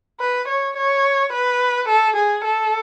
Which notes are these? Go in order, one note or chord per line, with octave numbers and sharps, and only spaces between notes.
B4
C#5
C#5
B4
A4
G#4
A4